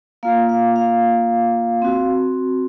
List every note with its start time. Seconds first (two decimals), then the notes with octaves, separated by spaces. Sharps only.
0.23 A#3 F4 F5
0.49 F5
0.76 F5
1.82 C4 F#4